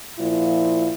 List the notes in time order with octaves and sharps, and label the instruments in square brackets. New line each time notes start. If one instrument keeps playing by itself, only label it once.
[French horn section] A#2 F3 E4